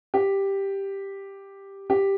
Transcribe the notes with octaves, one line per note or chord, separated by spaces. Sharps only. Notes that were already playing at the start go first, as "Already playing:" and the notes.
G4
G4